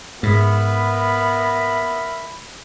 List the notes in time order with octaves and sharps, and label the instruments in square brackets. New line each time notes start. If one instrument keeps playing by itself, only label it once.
[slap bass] G#2 [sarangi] B3 [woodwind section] A#4 E5 B5